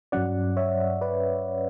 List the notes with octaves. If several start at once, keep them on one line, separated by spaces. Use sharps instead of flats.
G2 F#3 C#4 D5 F#5
C#5 E5
B4 D5